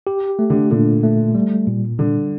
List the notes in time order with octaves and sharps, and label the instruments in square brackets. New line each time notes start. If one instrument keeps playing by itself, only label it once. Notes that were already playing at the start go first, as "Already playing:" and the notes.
[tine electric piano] G4
A3
[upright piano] D3
[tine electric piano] A#2 [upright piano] D3
[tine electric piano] A3
G3
A#2
[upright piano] D3 [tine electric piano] G3